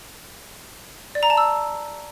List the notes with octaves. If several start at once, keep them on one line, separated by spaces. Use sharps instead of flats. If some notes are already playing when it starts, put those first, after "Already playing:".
D5
A#5
A5
E6